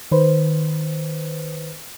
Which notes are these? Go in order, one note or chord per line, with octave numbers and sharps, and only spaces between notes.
D#3 B4 C5